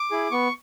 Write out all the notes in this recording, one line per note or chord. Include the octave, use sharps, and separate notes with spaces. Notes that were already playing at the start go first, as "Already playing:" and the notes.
Already playing: D6
E4 G#4
B3 C#6